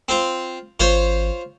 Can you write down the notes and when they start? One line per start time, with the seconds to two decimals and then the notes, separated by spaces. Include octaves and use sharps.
0.08 C4 F4
0.80 G#1 F4 C5 C#5